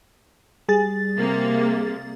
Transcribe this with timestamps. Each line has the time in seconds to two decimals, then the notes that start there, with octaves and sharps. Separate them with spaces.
0.68 G3 G#4 A6
1.18 C3 A#3